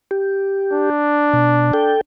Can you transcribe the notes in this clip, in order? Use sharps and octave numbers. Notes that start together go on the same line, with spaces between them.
G4
D4
B2
A4 G5